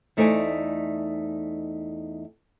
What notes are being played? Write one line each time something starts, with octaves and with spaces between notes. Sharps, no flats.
E2 A3 D#4 C5 D5 G#5